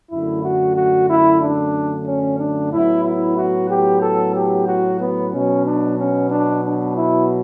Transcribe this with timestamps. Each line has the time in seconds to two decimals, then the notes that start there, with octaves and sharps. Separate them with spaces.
0.11 F#2 D3 A3 E4
0.44 F#4
0.76 F#4
1.09 E4
1.42 D4
2.07 C#4
2.40 D4
2.71 A2 F#3 B3 E4
3.05 E4
3.37 F#4
3.71 G4
4.02 A4
4.36 G4
4.67 F#4
5.00 B3
5.32 B2 F#3 B3 C#4
5.66 D4
5.99 C#4
6.30 D4
6.64 D4
6.96 E4